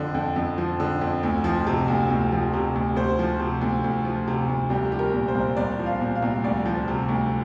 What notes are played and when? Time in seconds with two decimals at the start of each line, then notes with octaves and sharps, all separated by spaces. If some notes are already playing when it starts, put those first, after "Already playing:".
Already playing: F2 D3 F3
0.14 F2
0.36 F2
0.58 F3
0.80 D3
1.01 F2
1.23 D2
1.44 F3
1.67 C3
1.88 D2
2.10 D2
2.32 F3
2.53 C3
2.76 D2
2.96 D2 C5
3.19 F3
3.39 C3
3.61 D2
3.84 D2
4.05 F3
4.28 C3
4.48 D2
4.70 C2 G4
4.92 F3 G4
4.99 A#4
5.13 A#2
5.28 C5
5.35 C2
5.57 C2 D5
5.79 F3
5.86 F5
6.00 A#2
6.15 F5
6.22 C2
6.44 D2 D5
6.65 F3
6.88 C3
7.09 D2